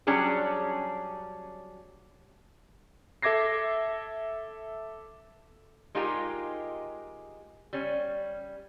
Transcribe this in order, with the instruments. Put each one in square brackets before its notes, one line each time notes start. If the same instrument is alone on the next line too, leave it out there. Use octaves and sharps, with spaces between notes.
[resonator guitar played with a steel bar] F#3 G3 C#4 D4 G#4
[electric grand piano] A4 E5 D6 G#6 A#6 C7
[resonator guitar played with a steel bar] G#3 D#4 F4 G4 G#4 A#4
G3 C#4